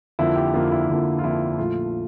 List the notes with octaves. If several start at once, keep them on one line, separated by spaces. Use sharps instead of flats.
F2 D3 F3 A#3 E4
G4
F2 D3 F3 A#3 F4
E4
F2 D3 F3 A#3
F4
F2 D3 F3 A#3 E4
A#1 A#2 F3 A3 F4